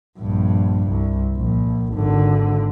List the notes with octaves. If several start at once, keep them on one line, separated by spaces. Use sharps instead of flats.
A#1 G2
C2
A#1
G#1 D3